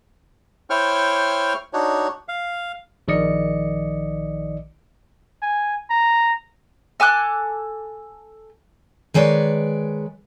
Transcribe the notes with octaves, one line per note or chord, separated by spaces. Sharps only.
E4 C5 C#5 G5 C#6 F6
D4 D#4 F#4 C#5
F5
A#1 D#3 D5 D#5 C#7
G#5
A#5
A4 G#5 D6 F#6
D#3 G#3 B4 C#5 D5